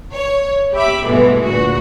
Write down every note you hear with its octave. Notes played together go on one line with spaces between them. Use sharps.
C#5
G4 E5 B5 D6
G2 B2 E3 G#3 A3
D2 A#2 F#4